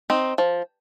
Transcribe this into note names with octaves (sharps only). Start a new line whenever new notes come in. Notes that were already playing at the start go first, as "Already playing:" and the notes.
C4 D#4
F3